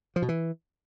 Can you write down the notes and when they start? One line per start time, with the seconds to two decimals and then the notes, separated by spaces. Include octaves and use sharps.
0.16 F3
0.22 B2
0.29 E3